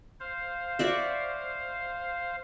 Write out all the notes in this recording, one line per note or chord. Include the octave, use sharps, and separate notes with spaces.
C5 F5
F#4 D5 E5